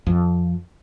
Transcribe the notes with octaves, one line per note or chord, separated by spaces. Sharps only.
F2